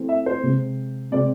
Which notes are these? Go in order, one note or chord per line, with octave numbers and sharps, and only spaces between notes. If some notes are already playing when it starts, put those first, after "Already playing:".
Already playing: E3 A3 C4
E5
C5
C3 G#3 C4
C3 G#3 C4 D5